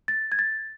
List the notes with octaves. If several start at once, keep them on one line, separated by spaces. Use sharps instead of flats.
A6
G#6
A6